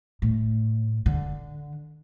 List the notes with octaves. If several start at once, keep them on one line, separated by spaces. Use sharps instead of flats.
A2
D3